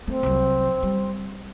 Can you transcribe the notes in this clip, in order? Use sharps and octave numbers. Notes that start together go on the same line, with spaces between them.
A3 C4
C2 F#3
G3